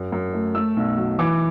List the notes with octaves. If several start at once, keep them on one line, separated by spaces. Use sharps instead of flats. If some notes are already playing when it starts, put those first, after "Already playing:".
Already playing: F#2
F#2
A3
A3 E6
B1
F#3
E3 D6